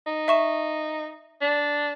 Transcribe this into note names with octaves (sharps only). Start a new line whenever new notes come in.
D#4
E5 C#6 E7
D4